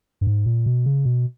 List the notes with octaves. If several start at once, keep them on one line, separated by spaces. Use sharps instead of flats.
G2
G#2
A#2
B2
C#3
B2